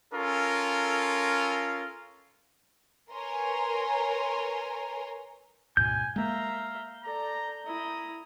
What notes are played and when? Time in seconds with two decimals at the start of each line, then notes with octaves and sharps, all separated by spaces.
0.12 C#4 F4 A4 A#4
3.12 A#4 B4 C#5 G#5 A#5 C6
5.77 D2 G#2 B2 G#5 G6
6.16 G#3 A#3 E5 F5 A#5
7.03 A4 D5 A#5
7.65 E4 A#5 D#6